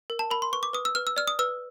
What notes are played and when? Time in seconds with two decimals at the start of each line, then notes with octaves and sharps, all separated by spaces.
0.10 A#4
0.19 A5
0.31 A#4 B5
0.42 C6
0.52 B4 C#6
0.63 D6
0.73 B4 D#6
0.85 E6
0.95 B4 F6
1.07 E6
1.17 D5 F6
1.28 D#6
1.39 B4 E6